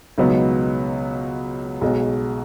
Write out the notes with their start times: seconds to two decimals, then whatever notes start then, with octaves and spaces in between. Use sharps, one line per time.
0.18 C#2 B2 F#3 B3 D#4
1.81 B1 B2 G#3